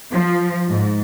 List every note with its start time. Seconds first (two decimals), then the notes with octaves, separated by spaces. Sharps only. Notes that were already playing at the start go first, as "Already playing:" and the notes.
0.12 F3
0.68 G#2